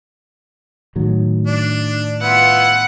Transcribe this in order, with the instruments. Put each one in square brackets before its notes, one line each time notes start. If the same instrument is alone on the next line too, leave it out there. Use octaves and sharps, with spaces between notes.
[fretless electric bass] A2 D#3 F#3
[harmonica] D4
[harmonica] B3 E4 F4 [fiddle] F#5